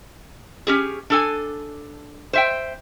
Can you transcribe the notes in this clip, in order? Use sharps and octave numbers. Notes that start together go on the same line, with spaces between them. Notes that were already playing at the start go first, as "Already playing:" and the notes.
C#4 G4 G#4
D4 A4 G#5
C5 E5 G5